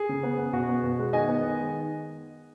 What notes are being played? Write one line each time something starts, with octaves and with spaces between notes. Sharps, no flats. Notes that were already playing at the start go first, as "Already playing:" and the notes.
Already playing: G#4
C#3
B3
B3
B2 F#4
B3
B2
G#3
D#3 D#5 G#5
B3
D#3
G#3